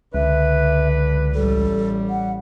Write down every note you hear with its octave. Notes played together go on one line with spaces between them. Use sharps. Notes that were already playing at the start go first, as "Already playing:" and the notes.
C#2 D3 B4 E5
A1 G3 A4
F#5